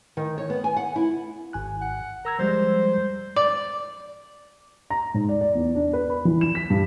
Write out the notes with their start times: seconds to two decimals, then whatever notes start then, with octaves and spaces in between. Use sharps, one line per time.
0.17 D#3
0.38 C#5
0.50 B3
0.64 G#5
0.77 F#5
0.96 E4
1.53 G#1 G#5 F#6
1.81 F#5
2.25 A#4 A#5 E6 G#6
2.39 F3 G3 G#3 C5
3.36 D5
4.90 A#5
5.14 G#2
5.29 D5
5.41 D5
5.55 E2
5.75 D4
5.93 B4
6.10 B5
6.25 E3
6.41 E7
6.55 B6
6.70 G2